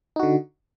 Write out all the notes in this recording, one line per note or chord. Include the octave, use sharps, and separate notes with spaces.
D3 D#4 F#4